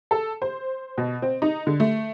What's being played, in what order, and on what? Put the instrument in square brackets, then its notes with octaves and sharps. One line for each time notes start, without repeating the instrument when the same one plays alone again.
[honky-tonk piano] A4
C5
B2
C4
D#4
D3
A3